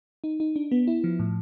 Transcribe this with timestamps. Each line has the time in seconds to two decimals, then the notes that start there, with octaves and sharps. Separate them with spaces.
0.24 D#4
0.40 D#4
0.56 D4
0.71 B3
0.87 E4
1.04 F3
1.19 A2